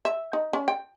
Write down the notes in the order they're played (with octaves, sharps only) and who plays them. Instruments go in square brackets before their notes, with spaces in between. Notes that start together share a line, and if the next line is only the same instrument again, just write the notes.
[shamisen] E5
D#4
C#4
G5